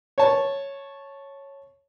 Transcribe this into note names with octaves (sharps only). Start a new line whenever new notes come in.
C#5 A5